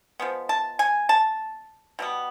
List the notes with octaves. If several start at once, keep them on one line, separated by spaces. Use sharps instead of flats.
F3 G#3 B3
A5
G#5
A5
B2 G3 B3